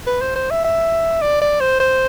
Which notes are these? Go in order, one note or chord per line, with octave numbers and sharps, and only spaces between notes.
B4
C5
C5
E5
E5
D5
D5
C5
C5